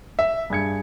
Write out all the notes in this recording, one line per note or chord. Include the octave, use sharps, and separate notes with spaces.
E5
G2 G#4 G#6 C#7